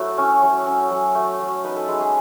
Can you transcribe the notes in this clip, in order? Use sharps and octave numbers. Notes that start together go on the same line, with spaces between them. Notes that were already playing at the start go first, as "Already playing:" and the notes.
Already playing: F#3 A3 E4 F#4
C#4 C#5
F#3 C#5
C#4
F#3
A3
F#3
D#4 B4
A4
G#3 B4
G#4